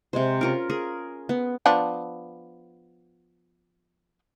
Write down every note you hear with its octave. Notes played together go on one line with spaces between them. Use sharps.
C3 G#3 C5
C#4 F4 A#4
G#4 A#4
B3
F3 B3 D4